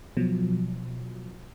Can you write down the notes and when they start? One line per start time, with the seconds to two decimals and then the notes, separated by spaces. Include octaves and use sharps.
0.17 B2 F3 F#3